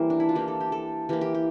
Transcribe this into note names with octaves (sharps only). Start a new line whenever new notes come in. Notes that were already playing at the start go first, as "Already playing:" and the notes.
Already playing: E3 G3 A#3 A#4 C5
D4
E4
F4
E3 G3 A#3 G4
A4
G4
A4
E3 A#3 G4
G4
G4